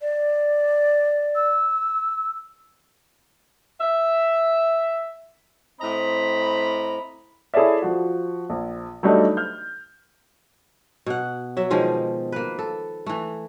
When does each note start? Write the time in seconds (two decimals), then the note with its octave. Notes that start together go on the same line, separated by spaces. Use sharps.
0.01 D5
1.35 E6
3.81 E5
5.80 A2 C4 D#5 A#5 B5
7.54 E4 G#4 A4 C#5 D5 E5
7.82 F3 F#4
8.50 A#1
9.03 F#3 G3 A3 D4 D#4
9.37 F6 G6
11.06 B2 F#5
11.57 F#3 E5
11.70 B2 D#3 F3 G#3
12.32 A#3 B4
12.59 A4
13.06 E3 A3